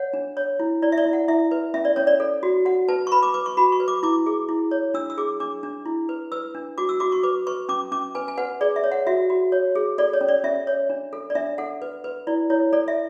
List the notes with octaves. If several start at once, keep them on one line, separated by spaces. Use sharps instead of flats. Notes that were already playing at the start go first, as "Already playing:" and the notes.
Already playing: C#5 F#5
D4
C#5
E4
E4 D5
E5
D5
E4
F#5
E4 E5
B4
C#4 E5
D5
C#4 C#5
D5
A4
F#4
F#4 F#5
B4 A5
C#6
B4 B5
D6
B4 D6
C#6
F#4 B5
C#6
B4
D6
E4 D6
G#4
E4
C#5
D4 E6
E6
G#4 D6
D4 D6
D4
E4
B4
B4 E6
D4
F#4 D6
E6
F#4 D6
C#6
B4 D6
B4 C#6
C#4 D6
C#4 D6
B4 G#5
G#5
B4 F#5
G#4 D5
E5
C#5
F#5
F#4 E5
F#4
C#5
G#4
A4 D5
C#5
C#4
D5
C#4 E5
C#5
D4
A4
D5
D4 E5
A4 F#5
B4
B4
E4 D5
E4 C#5
A4 D5
E5